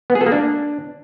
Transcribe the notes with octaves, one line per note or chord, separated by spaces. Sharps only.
B3
G#4
A4
A#3
D4